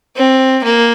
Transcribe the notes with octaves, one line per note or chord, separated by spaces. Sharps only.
C4
A#3